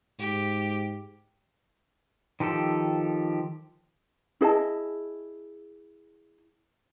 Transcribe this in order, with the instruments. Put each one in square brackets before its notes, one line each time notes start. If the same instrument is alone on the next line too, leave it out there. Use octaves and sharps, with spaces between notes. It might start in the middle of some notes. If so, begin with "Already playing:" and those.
[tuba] G#2 [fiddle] G4
[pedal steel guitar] D#3 F3 G4 A4
[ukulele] E4 G#4 D#5 A5